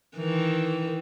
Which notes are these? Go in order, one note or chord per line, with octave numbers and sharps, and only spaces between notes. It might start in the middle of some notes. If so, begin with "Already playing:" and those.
D#3 E3